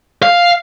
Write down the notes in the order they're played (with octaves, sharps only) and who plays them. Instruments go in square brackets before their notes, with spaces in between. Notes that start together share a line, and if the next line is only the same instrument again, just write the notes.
[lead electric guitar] F5